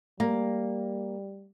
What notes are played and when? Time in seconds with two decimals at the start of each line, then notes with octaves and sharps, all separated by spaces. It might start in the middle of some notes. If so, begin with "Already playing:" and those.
0.20 G3 A#3